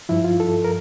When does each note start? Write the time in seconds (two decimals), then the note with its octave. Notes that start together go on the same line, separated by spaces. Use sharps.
0.09 G2 F3 E4
0.24 F4
0.40 A4
0.65 A#4